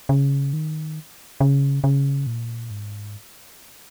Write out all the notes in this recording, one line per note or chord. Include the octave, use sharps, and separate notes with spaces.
C#3
D#3
C#3
C#3
A#2
G#2